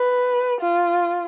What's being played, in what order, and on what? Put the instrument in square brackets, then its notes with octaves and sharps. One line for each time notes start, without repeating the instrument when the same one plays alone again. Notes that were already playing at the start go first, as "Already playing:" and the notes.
Already playing: [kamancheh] B4
F4